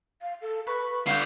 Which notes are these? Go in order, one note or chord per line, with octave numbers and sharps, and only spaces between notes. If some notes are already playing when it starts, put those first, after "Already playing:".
F5
A4
B4 C#6
D3 G3 F5 F#5 G6